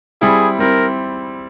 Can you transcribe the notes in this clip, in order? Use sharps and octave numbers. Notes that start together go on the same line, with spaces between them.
G3 C4 E4 G#4
G3 C4 E4 A#4